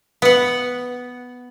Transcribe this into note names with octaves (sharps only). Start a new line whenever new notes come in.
B3 F#5